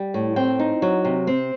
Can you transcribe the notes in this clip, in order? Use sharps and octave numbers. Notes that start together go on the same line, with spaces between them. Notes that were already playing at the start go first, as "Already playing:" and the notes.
Already playing: G3
A2
C4 G5
D#4
F#3
C3
C4